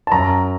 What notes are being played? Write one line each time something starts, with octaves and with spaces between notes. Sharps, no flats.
A5
F#2 A#5